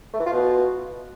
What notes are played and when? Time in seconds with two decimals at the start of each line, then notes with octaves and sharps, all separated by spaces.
0.13 A3
0.20 E3
0.26 F4
0.33 B2